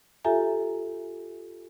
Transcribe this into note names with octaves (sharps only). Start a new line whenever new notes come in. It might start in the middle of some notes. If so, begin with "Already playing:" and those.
F4 G4 A4 E5 G#5 A#5